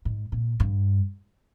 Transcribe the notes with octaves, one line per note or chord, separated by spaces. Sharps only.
G#2
A#2
G2